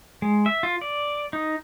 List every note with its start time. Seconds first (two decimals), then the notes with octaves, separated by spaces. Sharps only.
0.22 G#3
0.46 E5
0.63 F4
0.81 D5
1.33 D#4